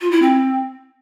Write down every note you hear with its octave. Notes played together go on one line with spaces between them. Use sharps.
F4
E4
C4